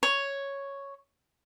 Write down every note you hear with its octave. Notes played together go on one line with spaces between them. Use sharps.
C#5